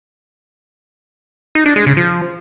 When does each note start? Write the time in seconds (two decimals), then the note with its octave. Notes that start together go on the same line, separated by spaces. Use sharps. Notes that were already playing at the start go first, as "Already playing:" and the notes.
1.55 D#4
1.66 D4
1.76 G#3
1.86 C#3
1.97 F3